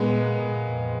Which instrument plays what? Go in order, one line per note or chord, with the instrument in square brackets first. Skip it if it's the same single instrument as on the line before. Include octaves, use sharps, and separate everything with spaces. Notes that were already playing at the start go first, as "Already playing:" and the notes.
Already playing: [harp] A#2 [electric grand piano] G#3 B3
[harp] A#3
A#2
F2